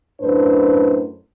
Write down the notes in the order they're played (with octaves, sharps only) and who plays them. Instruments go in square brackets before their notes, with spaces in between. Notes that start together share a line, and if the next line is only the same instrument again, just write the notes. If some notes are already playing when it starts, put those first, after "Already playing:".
[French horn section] F#2 A2 D4 B4 C5